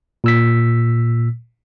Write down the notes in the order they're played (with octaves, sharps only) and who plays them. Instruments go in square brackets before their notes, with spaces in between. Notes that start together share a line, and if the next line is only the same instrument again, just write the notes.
[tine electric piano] A#2 E6 B6